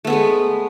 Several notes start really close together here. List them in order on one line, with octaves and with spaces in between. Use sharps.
A3 B3 G#4 G#3